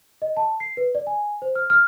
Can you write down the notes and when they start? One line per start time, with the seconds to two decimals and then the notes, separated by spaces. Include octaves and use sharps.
0.22 D#5
0.37 A5
0.60 C7
0.77 B4
0.95 D5
1.07 G#5
1.42 C5
1.55 F6
1.70 F6